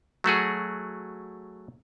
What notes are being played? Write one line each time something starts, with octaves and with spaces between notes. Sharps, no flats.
F#3 A3 F#4 G#4